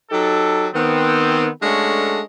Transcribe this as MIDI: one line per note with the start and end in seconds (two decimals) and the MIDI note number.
0.11 0.68 54
0.11 0.68 63
0.11 0.68 67
0.11 0.68 69
0.75 1.48 51
0.75 1.48 59
0.75 1.48 60
1.63 2.21 56
1.63 2.21 57
1.63 2.21 61
1.63 2.21 62
1.63 2.21 66
1.63 2.21 69